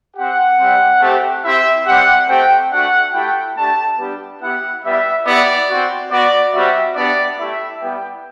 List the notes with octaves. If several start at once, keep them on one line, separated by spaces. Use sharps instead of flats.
C4 G4 F#5
G3 C4 G4
A3 C4 G4
C4 E4 G4 E5
G3 C4 G4 F#5
A3 C4 G4 G5
A3 D4 F#4 F#5
A3 E4 G4 G5
A3 D4 G4 A5
G3 B3 D4 G4
B3 E4 G4 F#5
G3 B3 E4 E5
B3 E4 G4 D5
C4 F#4
B3 F#4 D5
G3 C4 F#4 E5
B3 D4 G4 D5
A3 E4 G4 E5
G3 B3 E4 G4 G5